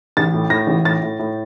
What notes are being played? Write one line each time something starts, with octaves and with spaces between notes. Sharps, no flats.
A1 A6
A2
A2 A#6
A1
A2 A6
A2
A2